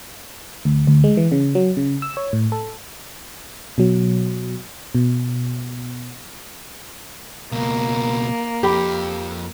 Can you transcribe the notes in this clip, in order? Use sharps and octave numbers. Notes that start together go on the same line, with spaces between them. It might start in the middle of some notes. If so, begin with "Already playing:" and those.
D2
D2
G#3
E3
C#3
F#3
C#3
E6
C#5
A2
A4
B2 F#3
B2
C#2 B2 A#3
F2 G4 B5